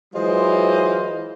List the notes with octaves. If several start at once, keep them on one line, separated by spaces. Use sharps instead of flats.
E3 F#3 G#3 F4 C5 D#5